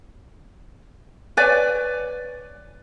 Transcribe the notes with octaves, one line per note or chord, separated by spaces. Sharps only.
B4 C#5 D5 G#5